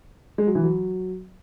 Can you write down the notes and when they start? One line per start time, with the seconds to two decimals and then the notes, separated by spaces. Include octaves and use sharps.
0.38 G#3
0.47 F#3
0.55 E3
0.64 F#3